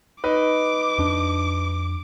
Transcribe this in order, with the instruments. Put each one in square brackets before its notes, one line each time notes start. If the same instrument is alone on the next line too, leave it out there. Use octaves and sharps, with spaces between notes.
[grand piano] D#4 B4 [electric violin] D6
[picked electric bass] F2 D4